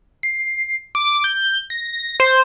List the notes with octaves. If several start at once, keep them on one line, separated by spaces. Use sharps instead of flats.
C7
D6
G6
A#6
C5